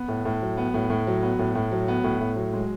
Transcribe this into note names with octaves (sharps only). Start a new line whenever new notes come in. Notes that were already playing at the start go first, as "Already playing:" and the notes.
Already playing: B3
A2
A2
F#3
B3
A2
A2
F#3
B3
A2
A2
F#3
B3
A2
A2
F#3
G#3